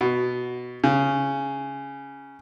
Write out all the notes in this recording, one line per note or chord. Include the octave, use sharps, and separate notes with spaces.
B2
C#3